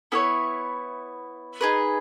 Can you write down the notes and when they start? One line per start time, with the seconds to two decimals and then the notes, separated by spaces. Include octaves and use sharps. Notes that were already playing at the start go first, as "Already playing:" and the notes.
0.12 B3 E4 A4 C#5
1.61 D#4 G#4 B4